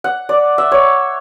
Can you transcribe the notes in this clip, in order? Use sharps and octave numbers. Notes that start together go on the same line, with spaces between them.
F#5
D5
E5
C#5